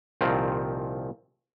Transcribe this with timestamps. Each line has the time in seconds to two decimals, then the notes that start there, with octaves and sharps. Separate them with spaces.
0.21 C2 A#2 D#3 F3 C4